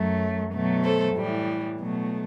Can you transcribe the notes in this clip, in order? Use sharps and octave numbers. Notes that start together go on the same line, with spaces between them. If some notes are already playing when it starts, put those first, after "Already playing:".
Already playing: F#2 F#3 A3
B2 F#3 A3
A4 C5
A2 E3 G3
B2 F#3 A3